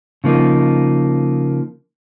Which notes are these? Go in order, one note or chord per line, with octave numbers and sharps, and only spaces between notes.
C#3 F3 A#3 D#4